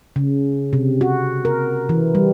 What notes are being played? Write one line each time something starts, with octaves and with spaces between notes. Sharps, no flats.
C#3
C3
F#4
A#4
E3
G3